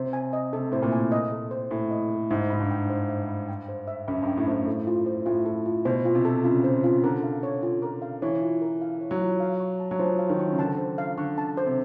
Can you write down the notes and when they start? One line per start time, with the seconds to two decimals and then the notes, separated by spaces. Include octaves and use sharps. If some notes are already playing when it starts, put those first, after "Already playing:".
Already playing: C3 C5
0.13 G#5
0.33 D#5
0.53 C3 A4
0.72 A2 C5
0.83 A#2
0.92 G#5
1.12 D#5
1.32 A4
1.51 C5
1.71 A2 G#5
1.91 D#5
2.11 A4
2.30 G#2 E5
2.50 G#2 B5
2.60 G2
2.70 G5
2.90 C5
3.09 E5
3.29 B5
3.49 G5
3.69 C5
3.88 E5
4.08 F#2 B5
4.22 G2 G5
4.37 A2
4.47 A2 C5
4.67 A4
4.87 F4
5.06 C5
5.26 A2 F4
5.46 A4
5.66 F4
5.85 B2 C5
6.05 F4
6.15 C3
6.25 A4
6.44 C#3 F4
6.64 C5
6.84 F4
7.04 D3 A#4
7.24 F5
7.43 C#5
7.63 F4
7.82 A#4
8.02 F5
8.22 E3 C#5
8.42 F4
8.61 A#4
8.81 F5
9.01 C#5
9.11 F#3
9.21 F4
9.40 F5
9.60 C#6
9.80 A5
9.91 F#3
9.99 F3 C5
10.19 F5
10.29 D#3
10.39 C#6
10.52 C#3
10.58 D3 A5
10.78 C5
10.98 F5
11.17 D3 C#6
11.38 A5
11.57 C5
11.66 C3